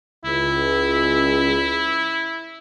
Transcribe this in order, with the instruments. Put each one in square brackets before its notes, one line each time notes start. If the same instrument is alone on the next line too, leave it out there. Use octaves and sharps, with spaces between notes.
[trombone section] C#2 [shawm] E4